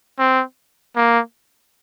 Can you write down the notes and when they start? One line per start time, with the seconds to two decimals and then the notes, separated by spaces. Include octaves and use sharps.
0.19 C4
0.96 A#3